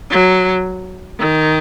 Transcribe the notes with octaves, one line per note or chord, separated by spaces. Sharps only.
F#3
D#3